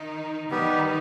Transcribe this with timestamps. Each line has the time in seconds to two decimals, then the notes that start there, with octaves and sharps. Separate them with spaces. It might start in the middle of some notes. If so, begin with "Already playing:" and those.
Already playing: D#3 D#4
0.50 D#3 G3 B3 D#4 G4 B4